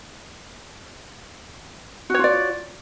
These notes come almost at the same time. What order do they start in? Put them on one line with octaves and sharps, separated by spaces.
F#4 C#5 F4 D5